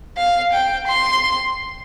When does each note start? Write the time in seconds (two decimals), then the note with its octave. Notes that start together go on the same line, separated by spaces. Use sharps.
0.17 F5
0.53 G5
0.87 C6